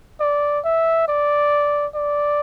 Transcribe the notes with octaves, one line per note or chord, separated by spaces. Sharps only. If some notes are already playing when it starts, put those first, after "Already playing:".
D5
E5
D5
D5